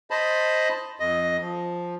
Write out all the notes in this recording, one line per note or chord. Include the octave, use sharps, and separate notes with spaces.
C5 D#5 A5 B5
F2 D#5
F3